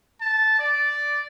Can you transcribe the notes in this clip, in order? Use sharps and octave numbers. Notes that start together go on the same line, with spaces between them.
A5
D5